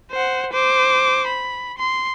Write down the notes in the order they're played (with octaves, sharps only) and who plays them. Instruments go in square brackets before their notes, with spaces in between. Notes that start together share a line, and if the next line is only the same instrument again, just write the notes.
[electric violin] C5 F#5
C5 D6
B5
C6